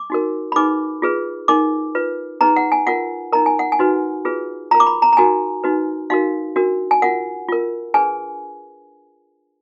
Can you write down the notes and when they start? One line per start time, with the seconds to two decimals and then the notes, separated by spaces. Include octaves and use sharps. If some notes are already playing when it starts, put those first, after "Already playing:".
Already playing: D6
0.10 D#4 F#4 A#4
0.52 B5
0.56 D#4 G#4 B4 D6
1.02 F4 G#4 B4
1.48 D#4 A#4 D6
1.95 F4 B4
2.41 D#4 G#4 B4 A#5
2.56 F#5
2.72 G#5
2.87 F4 A#4 F#5
3.33 D#4 A#4 A#5
3.46 G#5
3.59 F#5
3.72 G#5
3.79 D#4 F#4 B4
4.25 F4 G#4 B4
4.71 F4 A#4 A#5
4.80 D6
4.87 B5
5.02 A#5
5.13 A#5
5.17 D#4 F#4 A#4 G#5
5.64 D#4 F#4 B4
6.10 D#4 F#4 A#4 F5
6.56 D4 F#4 A#4
6.91 G#5
7.02 F4 A#4 F#5
7.49 F4 A#4
7.94 D4 G#4 B4 G#5